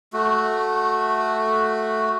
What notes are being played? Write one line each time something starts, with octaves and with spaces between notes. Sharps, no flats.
A3 F#4